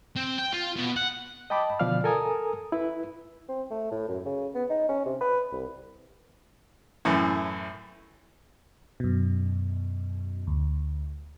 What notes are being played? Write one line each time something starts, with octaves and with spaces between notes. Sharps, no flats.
C4
G5
F4
B2
F#5
D#5 G5 A5 B5 D6
B2 D3 F3 D5 F5 F6
A4 A#4 G#5 A#5 D#6
E4 B4
C4
A3
A2
F#2
C#3
B3
D#4
C#4
C3
B4
C2
F#2 A2 E3
F#2 B2
D2